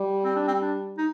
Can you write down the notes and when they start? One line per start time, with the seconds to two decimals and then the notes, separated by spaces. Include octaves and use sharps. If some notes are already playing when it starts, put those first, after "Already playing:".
Already playing: G3
0.24 C4
0.36 D4
0.48 C4
0.62 D4
0.98 D#4